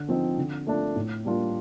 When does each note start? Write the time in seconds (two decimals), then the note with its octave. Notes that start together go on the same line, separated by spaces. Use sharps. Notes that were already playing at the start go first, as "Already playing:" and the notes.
Already playing: D3
0.09 F3 C4 D#4
0.38 D3
0.67 A3 D4 F4
0.96 A2
1.25 G3 A#3 D4 F4